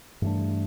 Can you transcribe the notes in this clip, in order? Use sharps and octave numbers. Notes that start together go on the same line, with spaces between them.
G2 E3 A3 D4